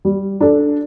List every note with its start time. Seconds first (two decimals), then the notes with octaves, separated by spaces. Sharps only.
0.05 G3
0.40 D4 A4